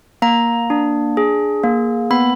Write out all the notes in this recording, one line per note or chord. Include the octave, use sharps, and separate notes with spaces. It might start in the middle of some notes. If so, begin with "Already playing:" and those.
A#3 A#5
D4
G#4
A#3
B3 B5